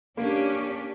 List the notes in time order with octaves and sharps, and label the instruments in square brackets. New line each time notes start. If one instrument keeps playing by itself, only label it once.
[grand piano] A#3 [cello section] C#4 D4 G4